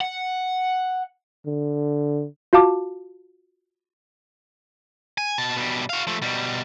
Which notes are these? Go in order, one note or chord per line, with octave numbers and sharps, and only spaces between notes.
F#5
D3
F4 F#4 F5 A5 D6
G#5
B2 A5
B2 G3
F#4 F5
F3 A3
B2 G3